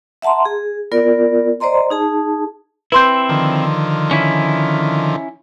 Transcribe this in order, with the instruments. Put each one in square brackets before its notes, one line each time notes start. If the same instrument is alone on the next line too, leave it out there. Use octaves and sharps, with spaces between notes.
[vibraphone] E5 F#5 A5 A#5 C6
G#4
B3 F4 A#4 D5
C5 D5 D#5 A#5 C6
D#4 G#4 A5
[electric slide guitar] C4 E4 [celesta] B4 C6 G6
[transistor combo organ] D3 D#3 F3
[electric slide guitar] C#4 E4